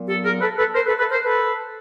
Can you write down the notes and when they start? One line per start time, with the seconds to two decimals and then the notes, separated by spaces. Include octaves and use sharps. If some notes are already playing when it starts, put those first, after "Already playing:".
Already playing: A#2 F#3 B3
0.09 G4 A4
0.24 G#4 A#4
0.41 A4 B4
0.57 A4 B4
0.74 A#4 C5
0.86 A4 B4
0.98 A4 B4
1.11 A#4 C5
1.23 A4 B4